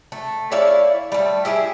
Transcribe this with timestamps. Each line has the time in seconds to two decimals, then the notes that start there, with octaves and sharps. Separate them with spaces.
0.12 A3
0.52 E4 C#5 D5 F5
1.12 G3 A3
1.45 E4 G4 G#4 E5